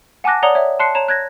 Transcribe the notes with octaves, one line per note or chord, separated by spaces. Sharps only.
F#5 G#5 A5 D6 F#6 A#6
C#5 D5 F#5 A#5 D#6 G7
C#5 E5
A5 C6 F#6 C7 C#7
C#5 A#5 E7
F#6 G#6 A#6